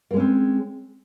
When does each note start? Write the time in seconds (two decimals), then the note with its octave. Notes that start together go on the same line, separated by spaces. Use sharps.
0.11 A#3
0.14 G#3
0.17 C#4
0.20 C4